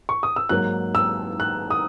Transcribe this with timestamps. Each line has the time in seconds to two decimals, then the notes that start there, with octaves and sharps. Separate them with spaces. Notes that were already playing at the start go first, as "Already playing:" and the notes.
0.09 C#6
0.23 D#6
0.36 E6
0.49 G#2 F#3 A#3 F#6
0.95 E6
1.40 F#6
1.70 D#6